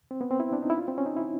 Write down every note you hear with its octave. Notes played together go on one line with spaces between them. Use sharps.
C4
B3
C4
E4
D4
D#4
E4
F4
C4
C#4
D#4
E4